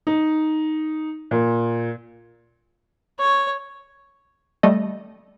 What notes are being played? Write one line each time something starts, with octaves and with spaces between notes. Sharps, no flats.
D#4
A#2
C#5
G3 A3 D#5